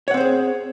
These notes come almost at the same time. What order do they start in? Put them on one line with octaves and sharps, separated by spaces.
C#5 F#5 C4 C5 G#4